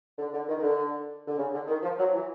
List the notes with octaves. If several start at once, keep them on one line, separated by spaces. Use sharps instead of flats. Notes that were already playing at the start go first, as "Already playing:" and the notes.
D3
D3
D#3
D#3
D3
D3
C#3
D3
D#3
F3
F#3
E3